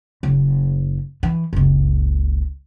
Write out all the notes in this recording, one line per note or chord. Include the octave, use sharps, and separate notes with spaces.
F#1
E3
F#1 C#2